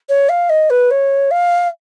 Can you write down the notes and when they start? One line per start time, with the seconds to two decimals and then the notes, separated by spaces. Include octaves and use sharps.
0.09 C#5
0.29 F5
0.49 D#5
0.70 B4
0.90 C#5
1.30 F5